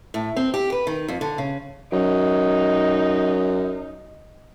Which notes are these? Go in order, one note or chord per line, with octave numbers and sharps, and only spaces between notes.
A2
C4
G4
B4
D#3
F2
D3
C#3
F#2 D#4